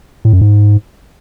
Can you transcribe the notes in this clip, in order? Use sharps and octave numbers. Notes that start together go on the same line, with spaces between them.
A2
F#2
G#2